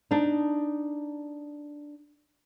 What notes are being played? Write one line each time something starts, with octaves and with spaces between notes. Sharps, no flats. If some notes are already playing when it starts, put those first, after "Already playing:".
D4 D#4